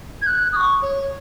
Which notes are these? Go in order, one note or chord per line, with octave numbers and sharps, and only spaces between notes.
G#6
F#6
D#6
C#6
C#5